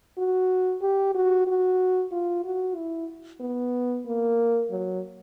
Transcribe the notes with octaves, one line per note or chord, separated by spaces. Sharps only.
F#4
G4
F#4
F#4
F4
F#4
E4
B3
A#3
F#3